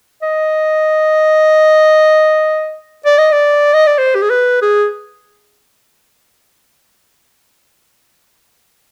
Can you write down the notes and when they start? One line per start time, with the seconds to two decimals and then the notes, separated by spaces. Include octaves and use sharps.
0.23 D#5
3.06 D5
3.19 D#5
3.32 D5
3.74 D#5
3.87 D5
3.99 C5
4.15 G4
4.22 G#4
4.30 B4
4.62 G#4